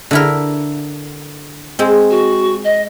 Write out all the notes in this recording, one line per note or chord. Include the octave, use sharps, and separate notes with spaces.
D3 E4 A#4
G#3 C4
F#4
D#5